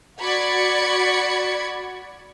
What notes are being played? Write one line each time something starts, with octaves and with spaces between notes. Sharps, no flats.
F#4 D5 B5 G#6 C#7